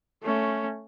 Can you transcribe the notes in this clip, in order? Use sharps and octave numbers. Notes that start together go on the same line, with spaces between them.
A3 C#4